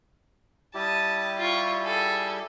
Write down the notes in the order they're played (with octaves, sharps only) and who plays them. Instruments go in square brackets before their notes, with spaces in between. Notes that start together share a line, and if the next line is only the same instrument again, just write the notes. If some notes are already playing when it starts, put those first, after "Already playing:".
[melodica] G3 E4 G4 [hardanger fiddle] A5 D#6
[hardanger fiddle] F4 C#6
G#4 A4